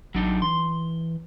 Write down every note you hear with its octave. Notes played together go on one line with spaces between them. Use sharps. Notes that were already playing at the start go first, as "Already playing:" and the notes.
A1 F#3 D4 D#4
E3 C6